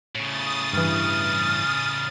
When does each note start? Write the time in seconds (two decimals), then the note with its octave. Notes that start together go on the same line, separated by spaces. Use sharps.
0.15 A2 C#3 D#6 A6
0.73 G2 E3 F6